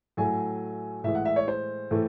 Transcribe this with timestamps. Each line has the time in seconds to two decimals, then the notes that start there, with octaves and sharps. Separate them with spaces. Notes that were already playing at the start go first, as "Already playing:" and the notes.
0.17 A2 F#3 A3 G#5
1.04 A2 E3 G#3 E5
1.15 F#5
1.25 E5
1.36 C#5
1.48 C5
1.91 A2 E3 A3